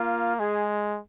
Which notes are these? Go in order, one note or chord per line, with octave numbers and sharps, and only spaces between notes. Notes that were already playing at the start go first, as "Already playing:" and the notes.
Already playing: A#3 F4
G#3 G#4